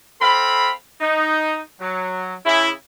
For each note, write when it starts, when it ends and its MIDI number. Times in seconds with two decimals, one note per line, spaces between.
0.21 0.70 60
0.21 0.70 69
0.21 0.70 77
0.21 0.70 83
1.01 1.58 63
1.81 2.35 54
2.45 2.70 49
2.45 2.70 64